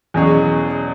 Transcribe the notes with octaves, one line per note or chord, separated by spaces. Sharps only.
E2 B2 F#3 C#4 G#4